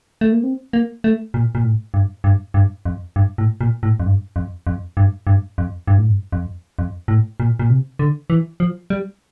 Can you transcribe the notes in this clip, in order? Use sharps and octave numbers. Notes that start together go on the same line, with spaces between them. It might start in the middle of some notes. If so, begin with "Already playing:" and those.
A3
A#3
C4
A#3
A3
A#2
A#2
A2
G2
G2
G2
F2
G2
A2
A#2
A2
F2
G2
F2
F2
G2
G2
F2
G2
A2
G2
F2
F2
A2
A#2
A#2
C3
D3
E3
F3
G3